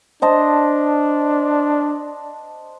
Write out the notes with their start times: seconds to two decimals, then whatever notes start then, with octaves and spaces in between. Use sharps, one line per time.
0.22 D4 C5 D#5 A5